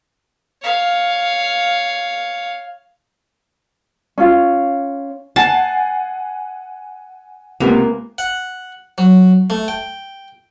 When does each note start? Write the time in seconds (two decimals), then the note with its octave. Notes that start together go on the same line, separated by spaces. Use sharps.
0.62 C#5 F5
4.18 C#4 F4
5.36 F#5 G#5 A5 C7
7.60 C#2 C3 A#3 B3
8.18 F#5
8.98 F#3
9.50 A3
9.68 G5